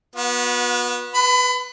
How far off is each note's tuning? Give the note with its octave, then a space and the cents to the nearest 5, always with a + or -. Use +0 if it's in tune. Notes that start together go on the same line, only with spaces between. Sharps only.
B3 -20 F#4 -40
B4 +0 B5 +35